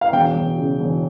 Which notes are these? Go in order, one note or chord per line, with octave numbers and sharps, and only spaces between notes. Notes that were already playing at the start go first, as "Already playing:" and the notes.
F5
E1 G5
E1
C#3
E1